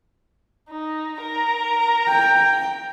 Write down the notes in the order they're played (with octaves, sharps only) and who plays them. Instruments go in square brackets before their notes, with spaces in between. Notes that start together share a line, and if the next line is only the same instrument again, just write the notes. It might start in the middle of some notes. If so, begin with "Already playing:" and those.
[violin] D#4
A#4 A#5
[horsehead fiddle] G5